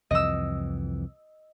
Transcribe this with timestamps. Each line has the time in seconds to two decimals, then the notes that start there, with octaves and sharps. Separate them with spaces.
0.11 C2 F2 E3 D#5 E6